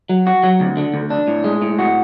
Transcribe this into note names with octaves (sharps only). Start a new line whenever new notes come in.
F#3
F#4
F#3
D2
D3
D2
D4
A2
G#3
A2
F#4